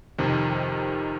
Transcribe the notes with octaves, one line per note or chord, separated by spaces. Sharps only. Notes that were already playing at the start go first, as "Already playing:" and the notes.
F2 C3 D#3